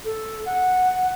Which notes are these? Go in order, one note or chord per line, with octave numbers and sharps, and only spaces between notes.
A4
F#5